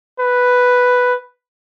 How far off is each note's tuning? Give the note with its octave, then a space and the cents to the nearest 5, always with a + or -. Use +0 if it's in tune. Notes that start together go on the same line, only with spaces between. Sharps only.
B4 +0